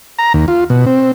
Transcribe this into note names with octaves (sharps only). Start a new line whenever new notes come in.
A#5
D#2
F4
B2
C4